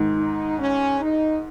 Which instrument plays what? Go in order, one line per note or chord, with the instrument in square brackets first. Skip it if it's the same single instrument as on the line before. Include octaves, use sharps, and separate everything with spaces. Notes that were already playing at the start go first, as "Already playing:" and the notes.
Already playing: [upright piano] G#2 D#3 G#3
[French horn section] D#4
C#4
D#4